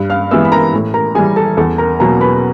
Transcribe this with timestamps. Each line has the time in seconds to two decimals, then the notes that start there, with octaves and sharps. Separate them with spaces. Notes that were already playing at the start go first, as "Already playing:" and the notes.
Already playing: G2
0.10 F5 F6
0.31 E3 G#3 B3 E5 E6
0.45 B5
0.52 A#4 A#5
0.74 A2
0.94 A#4 A#5
1.15 E3 G3 G#4 G#5
1.36 A4 A5
1.57 E2 A4 A5
1.78 A#4 A#5
1.99 B2 F#3 A#3 C#4 A#4 A#5
2.21 B4 B5